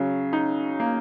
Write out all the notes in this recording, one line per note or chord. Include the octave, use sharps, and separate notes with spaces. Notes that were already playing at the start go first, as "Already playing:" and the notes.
Already playing: C#3 F#3
D#4
A#3